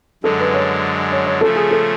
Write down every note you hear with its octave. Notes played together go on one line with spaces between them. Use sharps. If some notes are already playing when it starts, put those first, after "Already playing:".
F#2 D3 G#3 A4
B4
C#5
C#5
C#5
C#3 F3 A3 A4
G#4
A4